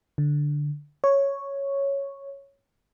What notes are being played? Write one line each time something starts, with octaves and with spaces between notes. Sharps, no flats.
D3
C#5